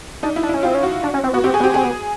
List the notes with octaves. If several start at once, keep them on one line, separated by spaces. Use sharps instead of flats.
D4 D#4
E4
D4
E4
C#4
C4 F4
C#4
F#4
D4
C#4
C4
B3 F#4
C4 G4
G#4
B3
C4 G4
C4 G#4
B3